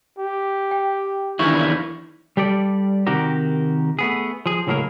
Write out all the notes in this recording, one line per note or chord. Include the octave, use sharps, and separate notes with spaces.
G4
G5
E2 D#3 D4 E4 C#6
G3 G4 A4 D5
C3 D#3 F#4 G4 A#4
A3 B3 G#4
F3 G#4
C#2 A2 F#3 A#3 G#4 A#4